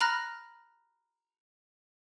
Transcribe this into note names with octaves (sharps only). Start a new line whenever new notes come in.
A#5 B5 F6 F#6 A#6